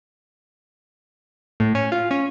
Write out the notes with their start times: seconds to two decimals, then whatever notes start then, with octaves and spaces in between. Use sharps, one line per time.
1.60 A2
1.75 C#4
1.92 F4
2.11 C#4